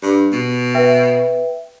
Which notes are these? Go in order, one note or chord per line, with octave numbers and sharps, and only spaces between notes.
G2
B2
B4 E5 G5